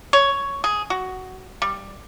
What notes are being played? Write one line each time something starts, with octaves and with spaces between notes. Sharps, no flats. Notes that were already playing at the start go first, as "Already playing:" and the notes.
C#5
G#4
F#4
G3